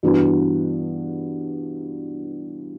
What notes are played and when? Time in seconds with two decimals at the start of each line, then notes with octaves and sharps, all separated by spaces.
0.03 G2 E3 B3 D4 F#4